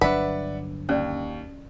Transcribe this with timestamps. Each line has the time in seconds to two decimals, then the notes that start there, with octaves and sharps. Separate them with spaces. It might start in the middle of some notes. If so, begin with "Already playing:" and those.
0.01 G1 F#3 D4 B4 D5 E5 F#5
0.89 D#2 C#4 D5